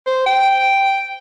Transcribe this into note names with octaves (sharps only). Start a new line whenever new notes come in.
C5
G5